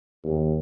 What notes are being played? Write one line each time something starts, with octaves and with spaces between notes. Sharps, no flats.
D#2